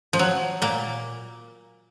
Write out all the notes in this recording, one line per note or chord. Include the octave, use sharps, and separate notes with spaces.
F3
F#3
A#2 A#3